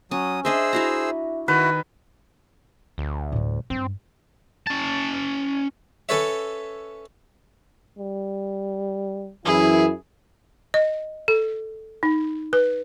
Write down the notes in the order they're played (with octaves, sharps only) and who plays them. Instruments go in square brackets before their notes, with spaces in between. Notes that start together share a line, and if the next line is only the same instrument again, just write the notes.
[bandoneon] F#3 D#6 [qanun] C#4
[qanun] D4 D#5 E5 [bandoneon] G#4 C5 E6
[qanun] E4 F#4 A#5
[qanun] D#3 [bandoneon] E4 F#4 [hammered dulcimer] B4
[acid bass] D2
[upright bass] A2 G3
[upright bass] G2 [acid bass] C4
[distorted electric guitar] C#4 A5
[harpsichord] C#4 A4 B4 C#5 E5
[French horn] G3
[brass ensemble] F#2 E4 [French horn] E3 [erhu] G#4
[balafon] D#5
A4
D#4
B4